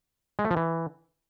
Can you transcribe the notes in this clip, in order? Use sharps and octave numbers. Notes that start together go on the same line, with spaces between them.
G#3
A3
F3
E3